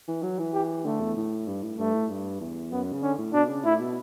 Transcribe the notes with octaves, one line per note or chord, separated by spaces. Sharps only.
E3
F#3
E3
G4
D3 A3
E2
A2
G2
A2
G2 A3
A2
G2
E2
F#2 B3
C#3
D3 C#4
A2
B2 D4
C#3
A2 E4
B2